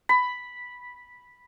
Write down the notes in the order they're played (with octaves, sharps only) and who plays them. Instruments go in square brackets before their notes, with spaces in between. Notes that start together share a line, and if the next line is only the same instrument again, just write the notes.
[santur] B5